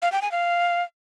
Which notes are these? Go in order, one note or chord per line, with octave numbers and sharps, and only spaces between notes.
F5
G5
G#5
F5